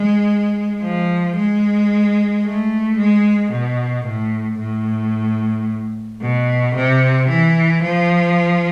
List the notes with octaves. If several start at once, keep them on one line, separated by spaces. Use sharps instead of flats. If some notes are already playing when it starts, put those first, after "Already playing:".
Already playing: G#3
F3
G#3
A3
G#3
B2
A2
A2
B2
C3
E3
F3